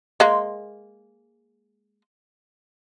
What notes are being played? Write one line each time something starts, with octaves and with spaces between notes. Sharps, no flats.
G#3 A#3